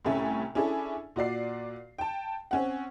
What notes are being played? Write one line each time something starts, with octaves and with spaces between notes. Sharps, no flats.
C2 A2 A3 C#4 E5 G#5
C#4 D4 E4 G#4 A4
A#2 F#4 D5 C7
G5 A5
C4 C#4 F#5